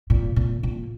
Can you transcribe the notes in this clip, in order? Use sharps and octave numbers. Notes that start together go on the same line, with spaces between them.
A#2
A#2
A#2